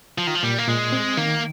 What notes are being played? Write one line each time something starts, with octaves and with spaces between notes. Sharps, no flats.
F3 F4
D#3
F3
A#2 G3
A#3
A#2 G#3
C4
D#3 A#3